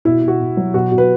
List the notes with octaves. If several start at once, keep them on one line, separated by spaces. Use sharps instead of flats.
B2 E4
B2 F#4
B2
F#3
B2 F#4
B2
B4